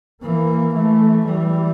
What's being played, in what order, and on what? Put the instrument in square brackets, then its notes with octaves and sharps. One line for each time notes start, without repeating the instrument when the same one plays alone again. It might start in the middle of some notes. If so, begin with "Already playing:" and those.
[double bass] E3 [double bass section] A#3
[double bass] E3 [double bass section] A3
[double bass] E3 [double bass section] G3